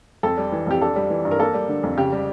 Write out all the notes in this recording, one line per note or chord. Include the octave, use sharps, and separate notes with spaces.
F2 A4
G3
E3
F2 G4
D4 A4
G3
E3
G2
A#4
A#3 A4
G3
D3
F2
C#3 G4
G3